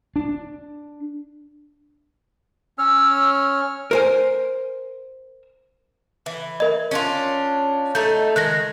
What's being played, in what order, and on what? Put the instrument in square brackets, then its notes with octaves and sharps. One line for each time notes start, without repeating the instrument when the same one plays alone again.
[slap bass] D4
[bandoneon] C#4 C#5 F6 [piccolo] E6
[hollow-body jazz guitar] A#4 C5 G#5
[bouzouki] E3
[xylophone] A#4 D#5
[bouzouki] C#4 D4 F4
[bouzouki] A3 D#4 [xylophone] G6
[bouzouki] D#3 G#3 [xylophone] F#6 A#6